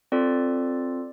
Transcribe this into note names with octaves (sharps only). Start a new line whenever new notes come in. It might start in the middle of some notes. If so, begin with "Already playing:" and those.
C4 F4 A4 D5